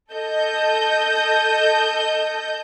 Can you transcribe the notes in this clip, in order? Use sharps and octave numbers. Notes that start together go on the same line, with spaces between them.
A4 D#5 G6